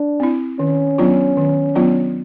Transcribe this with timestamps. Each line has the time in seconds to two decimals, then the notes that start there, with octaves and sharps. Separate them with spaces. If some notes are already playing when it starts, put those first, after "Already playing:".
Already playing: D4
0.20 C4 E4
0.59 D#3 C#4
0.98 F#3 B3 D4 F4
1.37 D#3
1.75 F#3 B3 D4 F4